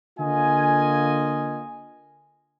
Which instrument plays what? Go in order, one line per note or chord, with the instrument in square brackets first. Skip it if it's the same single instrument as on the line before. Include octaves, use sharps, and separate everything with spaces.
[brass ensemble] D3 A#3 F4 D#5 G#5